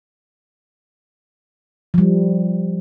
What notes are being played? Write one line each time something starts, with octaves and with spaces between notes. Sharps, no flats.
F3 G3